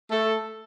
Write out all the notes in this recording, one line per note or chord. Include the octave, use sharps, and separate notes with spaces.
A3 A4